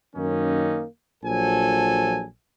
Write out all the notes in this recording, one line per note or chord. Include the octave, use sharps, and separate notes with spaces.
F#2 D#3 A#3 C#4 D#4
A#1 F3 F#3 A4 G#5